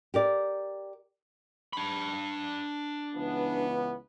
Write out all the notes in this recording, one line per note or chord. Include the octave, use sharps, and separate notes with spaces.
G4 A#4 D5
D4 B5
C#2 E3 B3